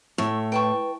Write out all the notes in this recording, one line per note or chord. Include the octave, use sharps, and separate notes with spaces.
A2 E5 C#6
B4 G5 A5 C#6